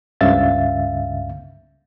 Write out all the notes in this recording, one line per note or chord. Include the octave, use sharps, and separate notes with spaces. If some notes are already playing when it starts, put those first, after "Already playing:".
C#2 G2 C#3 E5 F5 A6